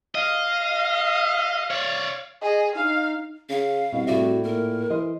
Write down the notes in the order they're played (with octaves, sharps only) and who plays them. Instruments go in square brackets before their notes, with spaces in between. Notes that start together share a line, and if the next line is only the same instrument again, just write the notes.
[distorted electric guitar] D#5 [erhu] F5
[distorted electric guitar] C#5 D5
[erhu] G#4 [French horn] D#5
[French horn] D#4 [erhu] F5
[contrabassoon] C#3 [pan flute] F5
[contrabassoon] C2 [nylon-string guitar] B2
[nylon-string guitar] A2 D5 E5 [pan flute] F#4
[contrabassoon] A#2 [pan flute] A#4
[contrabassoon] E3 [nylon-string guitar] C5 D#5